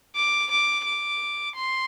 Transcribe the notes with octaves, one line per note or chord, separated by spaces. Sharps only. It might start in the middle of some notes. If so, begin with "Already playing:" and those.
D6
D6
D6
C6